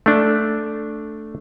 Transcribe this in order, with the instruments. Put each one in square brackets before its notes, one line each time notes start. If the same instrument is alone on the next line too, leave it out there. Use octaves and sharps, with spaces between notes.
[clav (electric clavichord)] A3 D4